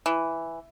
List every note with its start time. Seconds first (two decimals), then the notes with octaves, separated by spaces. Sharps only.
0.06 E3